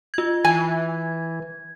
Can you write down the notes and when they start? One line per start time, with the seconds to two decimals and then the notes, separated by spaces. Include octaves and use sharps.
0.14 F4 G#6
0.45 E3 G#5 G#6